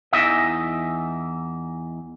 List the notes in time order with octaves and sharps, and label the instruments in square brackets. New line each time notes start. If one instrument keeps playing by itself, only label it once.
[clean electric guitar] E2 E3 D#4 D#5 E5